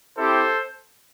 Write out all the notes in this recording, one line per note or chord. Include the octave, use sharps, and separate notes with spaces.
C4 E4 G4 A4 C5